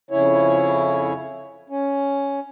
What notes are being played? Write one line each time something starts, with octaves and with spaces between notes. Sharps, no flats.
F2 C#3 C#4 E4 C#5
C#4